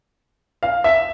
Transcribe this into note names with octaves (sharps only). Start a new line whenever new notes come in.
F5
E5